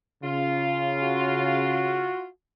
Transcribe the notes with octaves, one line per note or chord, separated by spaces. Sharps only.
C#3 F4
F#4